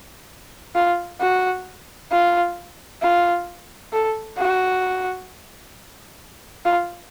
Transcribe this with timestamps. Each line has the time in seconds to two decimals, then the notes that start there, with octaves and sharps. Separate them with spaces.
0.75 F4
1.21 F#4
2.11 F4
3.02 F4
3.92 A4
4.38 F#4
6.65 F4